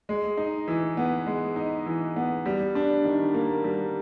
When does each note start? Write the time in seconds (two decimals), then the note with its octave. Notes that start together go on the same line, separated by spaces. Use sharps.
0.09 G#3
0.37 D#4
0.68 E3
0.97 B3
1.26 G#3
1.56 D#4
1.86 E3
2.16 B3
2.46 G3
2.75 D4
3.04 D#3
3.34 A#3
3.64 G3